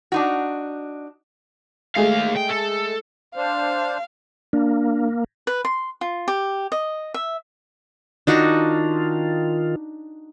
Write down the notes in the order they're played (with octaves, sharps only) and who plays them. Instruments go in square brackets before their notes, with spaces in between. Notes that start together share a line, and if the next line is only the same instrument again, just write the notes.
[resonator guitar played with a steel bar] D4 D#4 F#4
[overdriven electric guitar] D#2 F5 [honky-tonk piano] G#3 A3 G#4
[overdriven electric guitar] G5
A4
[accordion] D4 C5 [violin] F5
[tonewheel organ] A#3 [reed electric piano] D4
[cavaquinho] B4
C6
F4
G4
D#5
E5
[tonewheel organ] D#3 F4 [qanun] D4 D#4 F#4